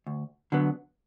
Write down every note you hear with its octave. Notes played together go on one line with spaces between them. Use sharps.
D2
D3 F#3 B3